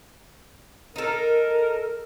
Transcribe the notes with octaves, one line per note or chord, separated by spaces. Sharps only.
D#4 A4 A#4